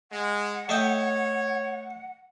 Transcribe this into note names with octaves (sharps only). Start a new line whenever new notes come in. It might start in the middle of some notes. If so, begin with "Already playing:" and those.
G#3 F#5
A3 C#5 D#5 G5